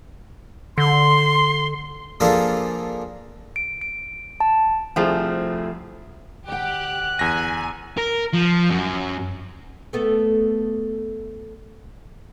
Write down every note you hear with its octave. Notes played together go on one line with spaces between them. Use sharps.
D3 C6
F3 A#3 D4 F4 G#4 A4
D7
D7
A5
C2 F3 A3 C4 G#4
D2 G4 F#5 F#6
E2 G#5 A#6
A#4
F3
F#2
A3 B3 A4